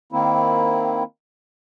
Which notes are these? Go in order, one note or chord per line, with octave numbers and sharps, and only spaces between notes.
D#3 A#3 C4 E4